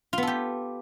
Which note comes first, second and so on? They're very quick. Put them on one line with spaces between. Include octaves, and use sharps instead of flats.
F4 B3 A4 G4